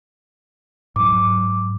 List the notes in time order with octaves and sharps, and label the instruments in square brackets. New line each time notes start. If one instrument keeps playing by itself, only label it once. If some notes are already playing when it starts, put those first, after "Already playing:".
[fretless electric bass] G#2 F#3 [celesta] D6